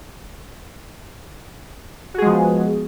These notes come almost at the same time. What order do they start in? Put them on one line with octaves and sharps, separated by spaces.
F#4 G#4 G#3 F3 B3